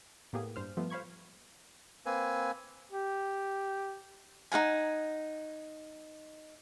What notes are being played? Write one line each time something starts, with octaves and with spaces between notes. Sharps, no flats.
A2 A#3 B3 G4 G#4
G2 C5 F6
F3 G3 A3 B3 F4
C5 F5 B5 C#6 G#6
A#3 C4 B4 G#5
G4
D#4 G#4 F#5 G#5